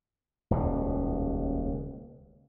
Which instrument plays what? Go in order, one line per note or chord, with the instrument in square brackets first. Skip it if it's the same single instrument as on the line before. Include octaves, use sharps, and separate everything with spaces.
[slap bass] D#1 C#2 B2